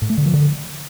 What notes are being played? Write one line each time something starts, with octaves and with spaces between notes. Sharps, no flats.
A2
A3
D3
F3
D3